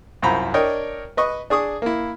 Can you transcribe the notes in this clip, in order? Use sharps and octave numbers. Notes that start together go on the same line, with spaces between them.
C2 F#2 F4 C5 A#5 B5
D4 A#4 C#5 D#5 G5
B4 D#5 C#6
D4 G#4 C#6 D#6
A#3 E4